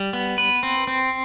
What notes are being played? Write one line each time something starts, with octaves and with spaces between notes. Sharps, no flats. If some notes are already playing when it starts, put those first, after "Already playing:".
Already playing: G3
B3
B4
C4
C4